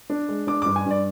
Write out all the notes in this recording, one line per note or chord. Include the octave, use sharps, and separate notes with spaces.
D4
G#3
D4 D6
G2 D6
G#5
G2 D5